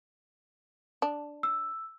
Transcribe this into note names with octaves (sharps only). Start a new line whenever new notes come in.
D4
E6